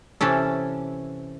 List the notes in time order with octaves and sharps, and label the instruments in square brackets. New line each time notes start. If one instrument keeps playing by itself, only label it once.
[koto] C3 E3 C#4 A4